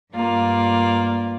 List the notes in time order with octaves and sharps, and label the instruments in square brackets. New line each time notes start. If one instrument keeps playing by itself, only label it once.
[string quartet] G2 A#3 F4 D5